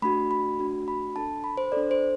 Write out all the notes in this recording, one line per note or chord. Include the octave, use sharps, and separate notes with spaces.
A3 D4 F#4 B5
B5
A3 D4 F#4
B5
D4 A4 A5
B5
C5
D4 A4 D5
C5